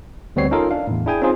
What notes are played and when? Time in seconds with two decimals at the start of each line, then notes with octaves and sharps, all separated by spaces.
0.36 D2 G3 B3 C4 C#5 C7
0.51 C#4 D#4 F4 A4 A#4 D#5
0.71 D4 F5
0.87 E2 A2
1.06 D4 E4 G#4 G5 G#5
1.22 C4 C#4 D#4 F4 G#4 C5